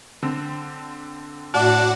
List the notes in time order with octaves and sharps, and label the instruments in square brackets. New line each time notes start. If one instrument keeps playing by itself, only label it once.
[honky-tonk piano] D3 C4
[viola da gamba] A2 [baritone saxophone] D4 [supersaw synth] F#4 D5 F#5